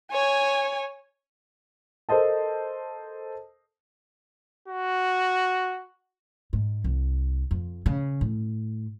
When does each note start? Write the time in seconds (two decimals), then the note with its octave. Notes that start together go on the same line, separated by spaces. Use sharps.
0.12 C#5 G#5
2.09 A4 A#4 C5 D#5 A5
4.68 F#4
6.53 G#2
6.84 C2
7.51 F2
7.86 C#3
8.21 A2